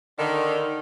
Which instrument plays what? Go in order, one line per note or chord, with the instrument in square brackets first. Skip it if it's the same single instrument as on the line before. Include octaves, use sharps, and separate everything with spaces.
[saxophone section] D3 D#3